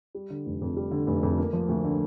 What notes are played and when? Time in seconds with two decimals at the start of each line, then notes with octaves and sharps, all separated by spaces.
0.15 G3
0.30 D3
0.46 F1
0.61 F2
0.77 G3
0.91 D3
1.07 F1
1.23 F2
1.39 A#3
1.53 F3
1.69 D2
1.84 D3